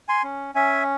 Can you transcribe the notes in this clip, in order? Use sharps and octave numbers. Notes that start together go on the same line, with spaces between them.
G#5 C6
C#4
C#4 E5 G#5